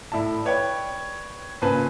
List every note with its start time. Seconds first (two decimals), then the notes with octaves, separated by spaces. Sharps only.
0.12 A2 E4 D5 A5
0.45 B4 C#5 D5 G5
1.62 A#2 C#3 B4 C5 G#5 A5